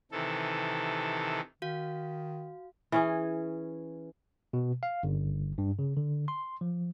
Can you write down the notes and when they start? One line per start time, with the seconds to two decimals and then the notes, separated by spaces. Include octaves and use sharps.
0.12 C3 D#3 E3 A4
1.62 D#3 F#4 F5
2.92 E3 C#4 G#4
4.53 B2
4.83 F5
5.03 G1
5.58 G2
5.79 C#3
5.97 D3
6.28 C6
6.61 F3